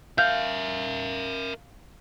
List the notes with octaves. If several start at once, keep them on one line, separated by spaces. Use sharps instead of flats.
A#4 E5 F5 G6